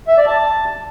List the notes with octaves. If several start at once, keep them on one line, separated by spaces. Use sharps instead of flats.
E5
D5
A5